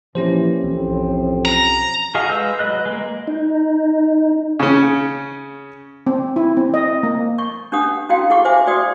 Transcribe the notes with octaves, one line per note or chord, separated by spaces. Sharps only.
A#2 E3 F3 C#4 G4 C5
B1 F2 A2 E3 C4
A#5
F#4 G#4 A4 D#5 F5
G#3 G#4 B4 E6 G6
F#3 B4 D#5 F#6
G#3 A#3
D#4
C#3 C#4
C4
E4
C4
D#5
A#3
C#6
C#4 D4 G4 F#5 D#6
C#4 E4 F#4 F5 G5
E4 G4 G#4 F#5 C#6 D6
C5 E5 G#5 D6
F#4 D5 G5 D#6